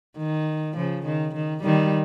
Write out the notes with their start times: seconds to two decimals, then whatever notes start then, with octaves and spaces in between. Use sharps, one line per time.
0.18 D#3
0.76 C#3 F3
1.05 D#3
1.34 D#3
1.63 D#3 G3